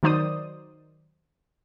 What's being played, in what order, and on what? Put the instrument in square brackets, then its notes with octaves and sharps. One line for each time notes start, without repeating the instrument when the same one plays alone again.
[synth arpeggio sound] D#3 F#3 D#4 C5 D5 D#6